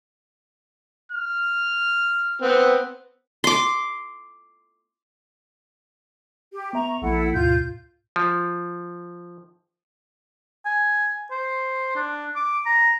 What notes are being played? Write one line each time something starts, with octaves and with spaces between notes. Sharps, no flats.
F6
B3 C4
C6 D6
G4
B3 E5 A#5 C#6
A#1 F3 A#3 E4 A4 F#5
D2 G#2 B2 F4 G6
F3
G#5
C5
D4
D6
A#5